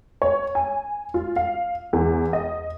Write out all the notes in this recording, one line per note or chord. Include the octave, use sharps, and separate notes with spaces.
C#5
G#5
F4
F5
E2
D#5